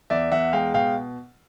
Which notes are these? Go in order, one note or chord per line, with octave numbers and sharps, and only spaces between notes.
E2 D5 E5
E2 E5 F#5
G#3 F5 G5
B2 F5 G5